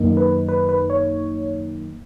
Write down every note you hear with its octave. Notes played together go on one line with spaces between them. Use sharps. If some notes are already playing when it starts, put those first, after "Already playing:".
Already playing: F#2 D#3 A#3 D#4
B4
B4
B4
C#5